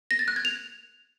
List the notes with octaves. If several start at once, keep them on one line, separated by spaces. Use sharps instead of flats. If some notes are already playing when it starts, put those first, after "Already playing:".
A#6
A6
F#6
G#6
F7